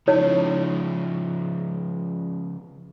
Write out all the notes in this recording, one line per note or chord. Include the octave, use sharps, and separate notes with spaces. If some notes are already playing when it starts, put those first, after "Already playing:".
C#3 F3 D#4 E4 C#5